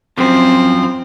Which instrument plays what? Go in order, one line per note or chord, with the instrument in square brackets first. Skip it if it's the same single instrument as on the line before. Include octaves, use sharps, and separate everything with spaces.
[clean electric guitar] F#2 F3 [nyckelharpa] C4